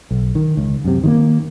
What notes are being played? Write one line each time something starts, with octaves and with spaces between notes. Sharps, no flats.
B1
D#3
C#2
F#2 C3
D#3 E3 A#3